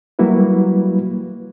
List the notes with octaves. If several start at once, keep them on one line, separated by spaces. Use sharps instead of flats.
F#3 G3 A#3 E4 F#4 B4